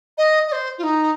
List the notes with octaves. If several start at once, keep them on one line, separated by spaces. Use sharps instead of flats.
D#5
D#5
C5
F4
D#4